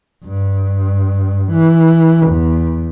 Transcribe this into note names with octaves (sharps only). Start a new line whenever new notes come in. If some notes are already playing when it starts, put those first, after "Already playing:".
G2
E3
E2